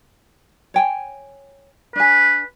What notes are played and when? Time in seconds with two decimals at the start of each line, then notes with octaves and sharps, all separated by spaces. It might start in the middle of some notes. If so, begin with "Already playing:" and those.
0.74 C#5 G5 G#5
1.96 D4 B4 G#5